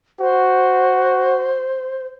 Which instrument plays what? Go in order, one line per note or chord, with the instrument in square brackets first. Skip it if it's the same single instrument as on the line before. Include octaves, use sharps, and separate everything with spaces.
[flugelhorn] F#4 [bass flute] C5